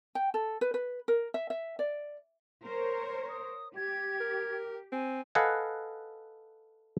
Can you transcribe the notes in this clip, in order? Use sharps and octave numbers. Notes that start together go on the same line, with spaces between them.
G5
A4
B4
B4
A#4
E5
E5
D5
A#4 C5 C#5
D#6
G4 G#6
A#4
C4 G#5
A4 B4 D#5 F5 F#5 G#5